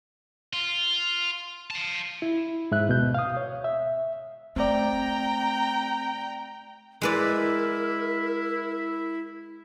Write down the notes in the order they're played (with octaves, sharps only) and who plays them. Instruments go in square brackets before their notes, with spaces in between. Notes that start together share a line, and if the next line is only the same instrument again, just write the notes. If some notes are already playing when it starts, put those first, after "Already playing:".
[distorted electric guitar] F4
F5 A5
[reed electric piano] E4
G#2 E5 F#6
D2 B2 G6
F5 D#6
C#5
E5
[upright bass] A3 [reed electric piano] C4 D5 [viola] G5 A#5
[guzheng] G#3 B4 D5 [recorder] E4 [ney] A#4